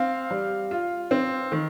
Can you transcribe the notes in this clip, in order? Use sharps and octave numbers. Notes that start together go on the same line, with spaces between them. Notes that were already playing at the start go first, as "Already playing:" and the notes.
Already playing: C4 F5
G3
F4
C4
D#3